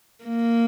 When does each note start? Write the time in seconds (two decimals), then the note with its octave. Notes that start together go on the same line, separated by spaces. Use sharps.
0.24 A#3